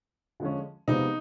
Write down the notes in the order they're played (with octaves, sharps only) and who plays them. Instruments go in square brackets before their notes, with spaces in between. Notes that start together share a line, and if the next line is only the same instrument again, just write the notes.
[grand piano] D3 F3 G#3 C#4
[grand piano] C3 F3 G#3 B3 [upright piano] D#4